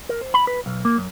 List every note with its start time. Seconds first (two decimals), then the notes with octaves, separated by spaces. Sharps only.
0.09 A#4
0.21 C5
0.34 B5
0.47 B4
0.66 B1
0.85 A#3
0.98 F#2